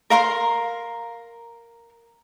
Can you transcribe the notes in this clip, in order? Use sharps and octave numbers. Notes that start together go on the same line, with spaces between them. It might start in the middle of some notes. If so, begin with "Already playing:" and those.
A#4 F5 A#5 C6